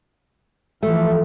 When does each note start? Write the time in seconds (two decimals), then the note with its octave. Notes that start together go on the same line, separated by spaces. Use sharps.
0.82 E3 F3 A3